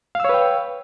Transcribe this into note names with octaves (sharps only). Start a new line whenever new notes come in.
B4 C#5 F5 G5 E6